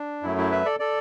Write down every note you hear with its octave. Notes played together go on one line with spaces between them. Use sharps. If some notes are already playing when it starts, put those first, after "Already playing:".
Already playing: D4
F#2 F#3 A3 E4
E4
B4 E5
A4 D5
A4 D5